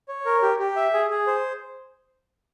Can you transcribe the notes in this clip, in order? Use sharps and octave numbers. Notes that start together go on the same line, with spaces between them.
C#5
A#4
G4
G4
E5
G#4
G#4
C5